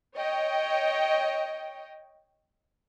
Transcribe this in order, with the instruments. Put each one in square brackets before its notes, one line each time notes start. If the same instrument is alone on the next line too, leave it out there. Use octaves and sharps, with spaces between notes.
[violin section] C#5 D#5 G5